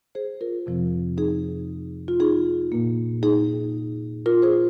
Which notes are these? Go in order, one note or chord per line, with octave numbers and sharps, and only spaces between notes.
G#4 C5
F4 A#4
F2 C3 F3 C4
D#4 G#4
F4
D#4 G#4
A#2 A#3
D#4 G#4
F4 A#4
G#4 C5